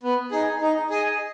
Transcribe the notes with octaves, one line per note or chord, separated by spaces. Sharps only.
B3
D#4 G#4
D#4
G#4 D#5